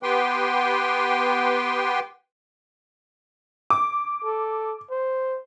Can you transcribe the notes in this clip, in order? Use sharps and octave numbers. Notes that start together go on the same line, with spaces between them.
B3 G4 B4 G5 C6
D6
A4
C5